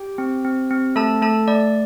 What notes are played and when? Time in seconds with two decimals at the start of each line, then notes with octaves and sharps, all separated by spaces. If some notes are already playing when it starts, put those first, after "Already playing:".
Already playing: G4 G5
0.18 C4
0.44 C4
0.71 C4
0.96 A3 A4 A5
1.21 A3 A4 A5
1.48 A3 D5